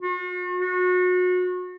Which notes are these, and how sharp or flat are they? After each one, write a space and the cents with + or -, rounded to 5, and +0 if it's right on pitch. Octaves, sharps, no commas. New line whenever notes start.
F#4 -45
F#4 -30